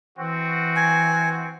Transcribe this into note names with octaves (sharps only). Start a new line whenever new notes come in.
E3 C4 F#4
G#5